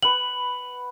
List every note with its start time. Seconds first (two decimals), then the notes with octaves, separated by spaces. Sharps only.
0.03 B4 F#5 F#7